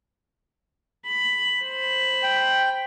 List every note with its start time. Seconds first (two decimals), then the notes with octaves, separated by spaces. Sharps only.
1.06 B5
1.63 C5 B5
2.23 G5